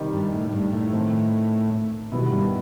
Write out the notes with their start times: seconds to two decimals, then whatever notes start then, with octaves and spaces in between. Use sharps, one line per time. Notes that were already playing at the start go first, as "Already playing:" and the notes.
Already playing: C3 D#3 G3 D#4 G4
0.13 G2
0.33 A2
0.53 G2
0.73 A2
0.93 D#3 A3 C4
2.12 B2 D#3 G3 B3 E4
2.32 G2